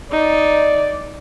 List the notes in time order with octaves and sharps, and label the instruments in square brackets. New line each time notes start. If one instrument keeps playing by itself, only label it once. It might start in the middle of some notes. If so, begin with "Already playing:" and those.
[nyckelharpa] D#4 [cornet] D5